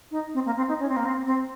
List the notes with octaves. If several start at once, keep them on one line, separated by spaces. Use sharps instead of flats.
D#4
C4
A#3
C4
D#4
C#4
C4
A#3
C4
C4